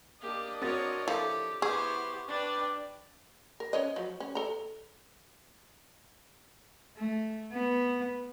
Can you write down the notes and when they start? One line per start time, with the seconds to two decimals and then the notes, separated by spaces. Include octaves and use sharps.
0.22 A#3 D4 G4 D#5
0.62 C4 F#4 A#4 C#5 A6
1.08 F3 E4 G4 A4
1.62 B3 E4 G4 G#4 C5 C#6
2.28 D4 B4 D5 G5
3.60 A#4
3.73 C#4 C#5 D#5
3.96 F3 F#3
4.20 C#4
4.35 A4 A#5
6.96 A3
7.53 B3